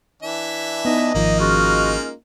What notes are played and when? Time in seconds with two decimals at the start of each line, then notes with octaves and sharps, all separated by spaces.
0.23 E3 D4 E5
0.85 B3 D#4 D#5
1.15 G#1 D#3 F3 A#3 D#4
1.40 G#3 C#4 F4 F#4